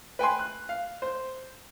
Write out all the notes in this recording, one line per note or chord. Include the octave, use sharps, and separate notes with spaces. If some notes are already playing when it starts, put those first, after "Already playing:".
B4 G5 G#5 C6
F#6
F5
C5